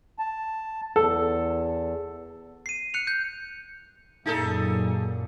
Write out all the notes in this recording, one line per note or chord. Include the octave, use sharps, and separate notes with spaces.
A5
E2 A4
C7 D#7
F#6 C#7 F7
G6
F#2 A#2 D#4 G#4 A4